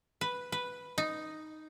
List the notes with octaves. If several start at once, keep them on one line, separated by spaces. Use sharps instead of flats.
B4
B4
D#4